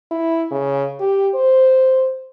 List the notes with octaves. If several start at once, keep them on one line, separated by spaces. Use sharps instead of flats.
E4
C#3
G4
C5